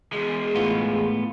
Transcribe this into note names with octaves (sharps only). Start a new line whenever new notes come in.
E2 G#3
A2 B3 F4